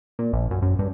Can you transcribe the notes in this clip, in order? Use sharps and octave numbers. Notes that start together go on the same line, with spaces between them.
A#2
A#1
F#2
F#2
G2